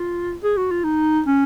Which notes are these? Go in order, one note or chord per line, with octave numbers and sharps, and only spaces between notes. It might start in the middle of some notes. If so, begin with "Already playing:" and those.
Already playing: F4
G#4
F#4
F4
D#4
C#4